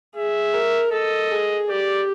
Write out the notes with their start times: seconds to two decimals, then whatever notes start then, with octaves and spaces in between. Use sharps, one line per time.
0.15 G#4 E5
0.54 A#4
0.92 A4 D#5
1.31 G#4
1.69 G4 D5